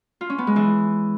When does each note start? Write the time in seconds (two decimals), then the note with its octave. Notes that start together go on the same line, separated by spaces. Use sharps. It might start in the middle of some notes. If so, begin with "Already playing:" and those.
0.21 F4
0.30 C#4
0.38 B3
0.47 G#3
0.56 E3